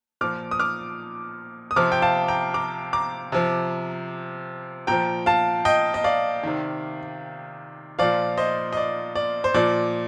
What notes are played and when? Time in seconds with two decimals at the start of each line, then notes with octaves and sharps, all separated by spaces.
0.21 A#2 F3 D6 F6
0.51 D#6
0.60 D6 F6
1.71 D#6
1.76 C3 F3 D6 F6
1.92 G5
2.02 F5 A5
2.28 G5 A#5
2.54 A#5 D6
2.93 A#5 D6
3.32 C3 F3
4.87 A#2 F3 G5 A#5
5.26 F5 A5
5.65 D#5 G5
5.94 D#5
6.04 D5 F5
6.43 C3 D#3
7.99 A#2 F3 D5 F5
8.38 C5 D#5
8.73 D#5
8.77 D5
9.15 D5
9.44 C5
9.54 A#2 F3 D5